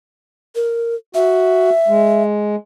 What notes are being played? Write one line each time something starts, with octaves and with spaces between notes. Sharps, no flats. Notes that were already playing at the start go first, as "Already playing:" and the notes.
A#4
F#4 E5
G#3